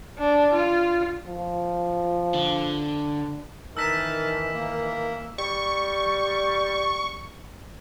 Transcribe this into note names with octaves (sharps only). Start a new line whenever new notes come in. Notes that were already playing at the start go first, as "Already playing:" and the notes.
D4
F4
F3
D3
D#3 E3 D#4 A#4 A5 E6 B6 E7
A#3
G3 C#6